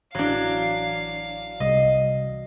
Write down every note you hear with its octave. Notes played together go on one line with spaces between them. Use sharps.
A1 E3 F#3 D4 F5
C2 D#5